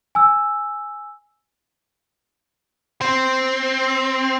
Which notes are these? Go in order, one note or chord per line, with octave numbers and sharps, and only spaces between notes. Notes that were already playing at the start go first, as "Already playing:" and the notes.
G#5 E6
C4